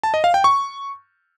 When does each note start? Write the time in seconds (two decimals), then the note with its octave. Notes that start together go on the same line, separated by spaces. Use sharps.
0.03 A5
0.14 D#5
0.24 F5
0.34 G5
0.44 C#6